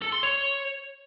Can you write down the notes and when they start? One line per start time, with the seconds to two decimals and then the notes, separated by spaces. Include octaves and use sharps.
0.02 A4
0.12 C6
0.23 C#5